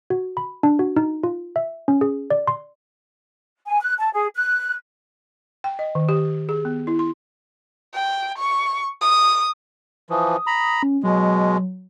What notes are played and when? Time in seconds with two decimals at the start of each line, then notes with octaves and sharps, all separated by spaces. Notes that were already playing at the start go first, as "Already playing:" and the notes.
0.10 F#4
0.37 B5
0.63 D4
0.79 F#4
0.96 D#4
1.24 F4
1.56 E5
1.88 C#4
2.01 G#4
2.30 D5
2.47 C6
3.67 G#5
3.81 F#6
3.98 A5
4.13 G#4
4.36 F#6
5.64 G5
5.79 D#5
5.95 D#3
6.09 G4
6.49 G#4
6.65 B3
6.87 E4
6.99 C6
7.94 G5
8.38 C#6
9.01 D#6
10.10 E3 F3 D#6
10.47 A#5 B5
10.83 C#4
11.04 B2 F#3 G#3